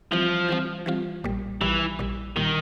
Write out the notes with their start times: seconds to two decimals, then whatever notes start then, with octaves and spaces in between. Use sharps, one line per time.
0.12 E3 F3 G3 C4 F4
0.49 E3 G3 C4 F4
0.86 E3 G3 C4 F4
1.24 A#1 A#2 G3
1.61 A#1 A#2 E3 G3
1.99 A#1 A#2 G3
2.36 A#2 D#3 G3